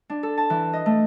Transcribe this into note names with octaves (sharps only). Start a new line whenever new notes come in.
D4
A4
A5
E3
D#5
A3